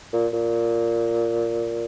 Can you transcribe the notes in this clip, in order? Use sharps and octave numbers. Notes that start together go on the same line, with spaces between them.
A#2
A#2